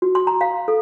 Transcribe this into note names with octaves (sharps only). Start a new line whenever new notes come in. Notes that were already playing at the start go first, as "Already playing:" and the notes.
F#4
C6
A#5
F5
A4